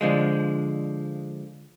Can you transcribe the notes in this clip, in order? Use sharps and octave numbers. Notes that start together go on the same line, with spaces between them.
D3 F3 G#3